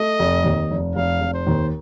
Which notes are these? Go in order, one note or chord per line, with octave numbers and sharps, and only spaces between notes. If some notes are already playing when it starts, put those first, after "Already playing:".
Already playing: A3 D#5
F1
D#2
F1
F1 F5
F1
C5
D#2